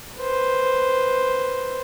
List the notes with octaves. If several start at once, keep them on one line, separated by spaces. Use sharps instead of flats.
B4 C5